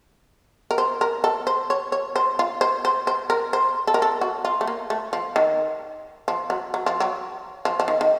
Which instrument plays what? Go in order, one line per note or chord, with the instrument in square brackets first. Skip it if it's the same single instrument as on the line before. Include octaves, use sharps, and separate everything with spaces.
[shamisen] A#4
C5
A#4
A4
C5
C#5
C#5
C5
F4
C5
C5
C5
A#4
C5
A4
A#4
A4
F#4
F4
A3
A#3
A3
F3
D#3
F3
F#3
F#3
F3
F#3
F3
F3
D#3
D#3